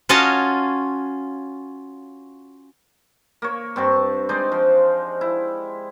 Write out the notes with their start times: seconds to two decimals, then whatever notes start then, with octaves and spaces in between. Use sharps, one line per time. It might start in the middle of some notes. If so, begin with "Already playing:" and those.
0.09 C#4 F4 F#4 C#5 D#5 A5
3.42 A#3 C#5
3.76 G2 C4 A5 C#6
4.29 G#3 D#4 C5 D5
4.52 F3
5.21 E4